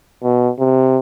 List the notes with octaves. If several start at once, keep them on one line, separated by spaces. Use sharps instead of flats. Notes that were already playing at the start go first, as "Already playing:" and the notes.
B2
C3